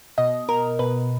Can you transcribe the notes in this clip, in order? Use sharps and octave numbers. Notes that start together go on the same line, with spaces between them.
B2 D#5
B2 A#4
B2 B4